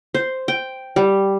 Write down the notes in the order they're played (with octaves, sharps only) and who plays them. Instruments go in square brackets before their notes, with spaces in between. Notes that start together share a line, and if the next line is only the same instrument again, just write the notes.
[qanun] C5
G5
G3